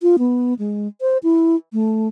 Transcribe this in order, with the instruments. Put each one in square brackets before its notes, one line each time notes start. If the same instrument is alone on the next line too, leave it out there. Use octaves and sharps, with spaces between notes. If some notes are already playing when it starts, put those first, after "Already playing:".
[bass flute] F4
B3
G#3
C5
E4
A3